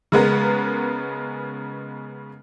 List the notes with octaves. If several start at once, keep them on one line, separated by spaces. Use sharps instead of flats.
C#3 G#3 B3 A#4